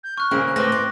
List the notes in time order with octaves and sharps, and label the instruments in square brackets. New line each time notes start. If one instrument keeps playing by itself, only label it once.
[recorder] G6
[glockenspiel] C#6 F#6 [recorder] F6
[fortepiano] A#2 C#3 C4 [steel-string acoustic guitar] A#3
[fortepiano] A2 [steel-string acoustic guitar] C4 B4 [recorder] C6 [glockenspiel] D6 F#6 A#6
[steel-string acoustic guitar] G4